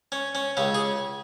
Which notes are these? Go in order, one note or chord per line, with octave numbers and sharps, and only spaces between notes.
C#4
C#4
C#2 C#3 C#4
G#4